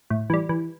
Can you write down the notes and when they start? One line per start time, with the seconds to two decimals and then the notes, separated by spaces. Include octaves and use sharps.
0.10 A2
0.30 E3 G3
0.49 E3